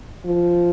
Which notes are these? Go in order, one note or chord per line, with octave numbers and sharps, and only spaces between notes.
F3